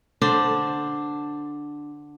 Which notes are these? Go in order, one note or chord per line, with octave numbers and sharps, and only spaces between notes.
D3 D4 C5